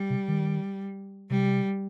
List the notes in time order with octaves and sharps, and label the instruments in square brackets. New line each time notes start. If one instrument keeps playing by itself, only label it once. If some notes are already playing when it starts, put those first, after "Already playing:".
Already playing: [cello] G3
[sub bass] C3
D#3
[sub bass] C3 [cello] G3